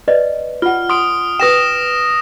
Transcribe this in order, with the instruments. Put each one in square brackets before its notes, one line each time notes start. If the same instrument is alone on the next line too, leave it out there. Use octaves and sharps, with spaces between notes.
[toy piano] B4 D5 D#5
[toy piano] F4 F#5 [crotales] F6
[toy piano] C6 [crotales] D#6 D7
[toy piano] B4 G5 [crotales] D#6 A#6 E7